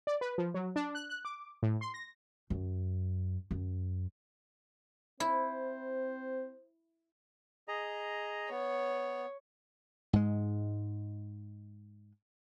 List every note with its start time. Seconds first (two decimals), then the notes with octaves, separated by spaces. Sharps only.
0.07 D5
0.21 B4
0.38 F3
0.54 F#3
0.76 D4
0.95 F#6
1.09 F#6
1.25 D6
1.63 A2
1.81 C6
1.94 A#6
2.50 F#2
3.51 F#2
5.20 C4 E4 C5
7.68 G#4 D#5 A#5
8.51 B3 C#5
10.13 G#2 G#3